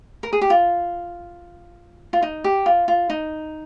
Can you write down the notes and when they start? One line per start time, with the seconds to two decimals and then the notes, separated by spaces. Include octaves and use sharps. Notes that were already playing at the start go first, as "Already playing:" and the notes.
0.23 A#4
0.33 G#4
0.42 G4
0.50 F4
2.13 F4
2.23 D#4
2.44 G4
2.66 F4
2.88 F4
3.10 D#4